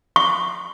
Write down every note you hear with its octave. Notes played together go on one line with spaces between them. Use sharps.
C#6